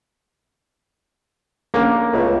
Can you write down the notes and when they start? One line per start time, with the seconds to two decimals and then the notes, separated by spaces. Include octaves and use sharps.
1.74 A#1 D3 A#3 C#4
2.13 C#2 A3 B3 E4